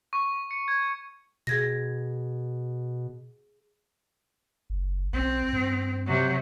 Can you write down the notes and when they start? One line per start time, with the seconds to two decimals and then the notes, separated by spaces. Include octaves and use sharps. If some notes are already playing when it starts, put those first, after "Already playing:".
0.13 C#6
0.51 C#7
0.68 G#6
1.47 B2 G#4 G#6 A#6
4.70 F#1
5.13 B1 C4
5.53 G2
6.06 C3 F#3